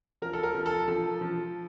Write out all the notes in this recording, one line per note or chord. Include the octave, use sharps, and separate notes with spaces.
F3 A#4
A4
A#4
F3
A4
F3 A4
F3